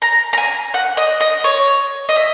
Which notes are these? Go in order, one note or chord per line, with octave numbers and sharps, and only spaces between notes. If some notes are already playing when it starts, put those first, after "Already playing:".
A#5
A#5
G#5
F#5
D#5
D#5
C#5
D#5
E5